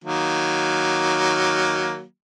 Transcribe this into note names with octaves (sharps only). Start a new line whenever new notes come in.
D#3 F#3 A#3